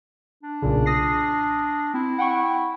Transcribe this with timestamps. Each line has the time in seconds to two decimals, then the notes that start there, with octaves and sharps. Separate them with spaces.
0.43 D4
0.62 B1 A#2 C#3
0.86 D#6 A#6 C7
1.94 C4 E4
2.18 F#5 G5 C#6